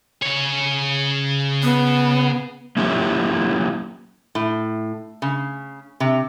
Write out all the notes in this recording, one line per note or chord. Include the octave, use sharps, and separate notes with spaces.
C#3 C#5
B3
F#3 A#3 C#4 E4 F4 G4
A2
C#3
C3